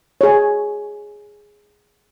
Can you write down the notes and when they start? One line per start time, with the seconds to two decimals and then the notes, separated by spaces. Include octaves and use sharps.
0.21 G#4 C#5